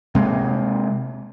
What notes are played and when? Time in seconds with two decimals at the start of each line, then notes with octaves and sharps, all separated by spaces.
0.15 C3 G#3 A#3